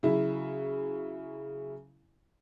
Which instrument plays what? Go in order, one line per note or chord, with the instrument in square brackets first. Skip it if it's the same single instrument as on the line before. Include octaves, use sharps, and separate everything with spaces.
[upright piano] C#3 F#3 E4